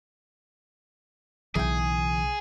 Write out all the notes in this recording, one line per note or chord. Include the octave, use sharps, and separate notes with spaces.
B1 C#3 E3 G#4 G5